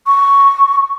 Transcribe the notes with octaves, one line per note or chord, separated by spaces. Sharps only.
C#6